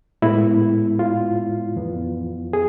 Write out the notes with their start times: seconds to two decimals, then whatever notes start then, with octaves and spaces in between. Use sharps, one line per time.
0.22 A2 G#3 B3 E4
0.99 F4
1.76 F2 E3 B3
2.53 G#4